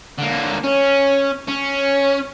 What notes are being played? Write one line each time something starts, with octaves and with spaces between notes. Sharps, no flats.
D3 A#3
C#4
C#4